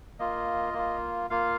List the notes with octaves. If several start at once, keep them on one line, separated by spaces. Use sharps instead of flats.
A#3 F4 D#5
A#3 F4
A#3 F4 F5